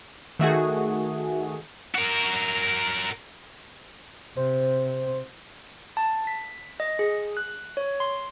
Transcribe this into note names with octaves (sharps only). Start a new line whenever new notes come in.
D#3 A3 F#4 G#4
F#4 A#4
C3 C5
A5
B6
D#5
G#4
F#6
C#5
C6